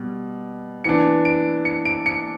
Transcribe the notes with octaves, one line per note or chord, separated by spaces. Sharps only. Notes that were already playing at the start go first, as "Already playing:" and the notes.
Already playing: B2 G3
E3 B3 D4 C#7
D7
C#7
D7
C#7